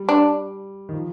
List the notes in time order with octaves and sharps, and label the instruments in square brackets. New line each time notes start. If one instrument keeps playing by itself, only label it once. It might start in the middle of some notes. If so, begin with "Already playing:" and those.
Already playing: [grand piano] G3
[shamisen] D4
[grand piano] D#3
F3